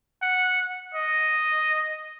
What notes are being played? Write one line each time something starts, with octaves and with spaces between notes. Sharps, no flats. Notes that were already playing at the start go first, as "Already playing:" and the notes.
F#5
D#5